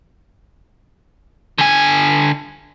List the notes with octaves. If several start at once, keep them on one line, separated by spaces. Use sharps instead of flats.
D3 G#5